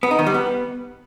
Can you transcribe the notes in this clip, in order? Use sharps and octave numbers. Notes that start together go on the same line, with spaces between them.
B3
D#4
D#3
G3
B3